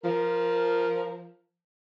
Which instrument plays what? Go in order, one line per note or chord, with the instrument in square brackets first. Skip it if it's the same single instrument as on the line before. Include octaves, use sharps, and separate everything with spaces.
[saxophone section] F3 A#4